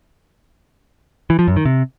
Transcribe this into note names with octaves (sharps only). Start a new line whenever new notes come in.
E3
F3
F#2
D#3
C3